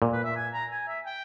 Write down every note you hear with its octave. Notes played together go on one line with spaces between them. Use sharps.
A#2
B4
E5
G#5
A#5
G#5
E5
G5